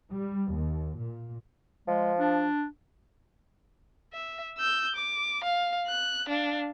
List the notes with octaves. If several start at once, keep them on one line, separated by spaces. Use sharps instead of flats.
G3
D#2
A#2
F3 G#3
D4
E5
E6 G6
D6
F5
F#6
D4 F5